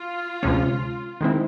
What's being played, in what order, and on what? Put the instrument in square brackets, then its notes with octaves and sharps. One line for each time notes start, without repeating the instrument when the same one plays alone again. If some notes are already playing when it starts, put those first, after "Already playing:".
Already playing: [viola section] F4
[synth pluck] D2 C3 F3 G#3 C#4
D#3 G#3 C4 E4